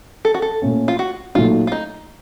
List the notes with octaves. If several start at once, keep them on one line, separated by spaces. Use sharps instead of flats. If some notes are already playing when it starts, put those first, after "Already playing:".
A4
F#4
A4
A#2 A3 C#4
F4
F#4
A#2 F#3 A3 D#4 F4 F#4
F4
D#4